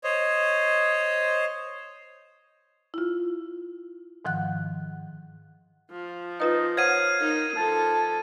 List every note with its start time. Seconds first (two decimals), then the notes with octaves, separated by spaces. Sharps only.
0.04 C5 C#5 D#5
2.94 E4 F4
4.25 G#2 D#3 F3 F#5 F#6
5.91 F3
6.40 D#4 F4 B4 D#5
6.77 C5 C#5 F5 F#5 G#6 D#7
7.21 D#4 A#4
7.57 F3 A4 A5